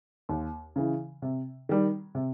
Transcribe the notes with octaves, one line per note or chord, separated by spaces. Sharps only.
D#2
C#3 E3
C3
D#3 G3
C3